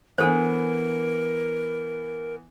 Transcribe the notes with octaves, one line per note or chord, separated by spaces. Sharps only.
E3 B3 D4 A4 A#4 C5